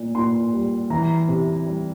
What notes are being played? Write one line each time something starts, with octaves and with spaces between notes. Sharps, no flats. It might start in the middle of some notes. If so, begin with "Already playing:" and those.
Already playing: A#2
A#2 C6
G3
E3 A#5
C3
G3